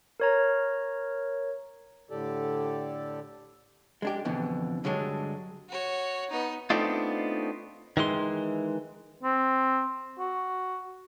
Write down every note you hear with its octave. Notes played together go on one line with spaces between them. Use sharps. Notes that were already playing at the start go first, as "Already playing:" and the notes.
A#4 C#5 A#5
A2 D3 G4 A4 D5
G#3 D4 G4
F2 B2 D3 E3
G2 D3 F#3 G#3 D4
F#4 C#5
B3 D#4
A3 B3 C4 D4 D#4 F4
D#3 E3 G#3 C6
C4
F#4